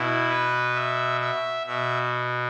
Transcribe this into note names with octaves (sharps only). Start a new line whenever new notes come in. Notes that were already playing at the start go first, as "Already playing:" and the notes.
Already playing: B2 E4
B4
E5
E5
B2 E5